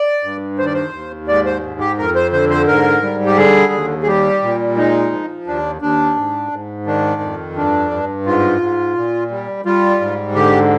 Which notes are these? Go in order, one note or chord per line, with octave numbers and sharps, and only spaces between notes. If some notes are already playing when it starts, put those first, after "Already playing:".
Already playing: D5
G2
D#2 C5
D5
C5
D#2
G#2 D5
C5
G#2
G4
F2 A#4
C5
D3 C5
C5
G#2 A#4
G3
G4
D3 G#4
D#2
G#4
G3 G4
A#2
G#3 D#4
F3
D#2 D4
D#2 D4
G#2
G#2
D#3 D4
F2
G2 D4
G2
G#2 F4
G#2
A#2
G3
G3 F4
G#2
D3 G4